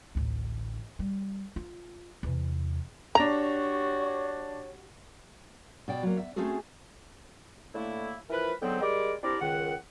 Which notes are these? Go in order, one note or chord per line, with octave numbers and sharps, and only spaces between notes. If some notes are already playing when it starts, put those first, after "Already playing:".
A1 D2
G3
F4
E2 C3
D4 F#4 G4 C#5 A#5 A#6 F7
B2 D5 G5
F#3 A#3
E5
A3 C4 C#4 F#4 G#4 A4
A2 D3 A3 A#3 E4
E3 F3 A#4 B4
G#2 D3 F#3 B3 C4 G5
G3 G#3 A#4 D5 D6
C4 D4 E4 G4 A#4 D5
C#2 D#3 F#5